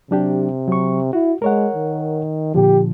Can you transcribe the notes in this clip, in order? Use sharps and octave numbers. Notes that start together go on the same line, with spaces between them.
C3 F#3 D4 G4
F#3 C#6
E4 F#4
G#3 A#4 C#5 F#5
D#3
A#2 D3 F3 G4